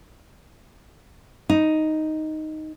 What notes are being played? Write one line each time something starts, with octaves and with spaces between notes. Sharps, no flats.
D#4